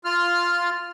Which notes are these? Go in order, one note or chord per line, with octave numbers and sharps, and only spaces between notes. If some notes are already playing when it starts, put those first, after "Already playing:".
F4 F6